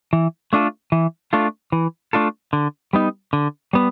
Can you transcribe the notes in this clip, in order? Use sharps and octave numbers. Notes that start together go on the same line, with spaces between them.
E3
A3 D4 F4 A4
E3
A3 D4 F4 A4
E3
A3 D4 F4 A4
D3
G3 B3 D#4
D3
G3 B3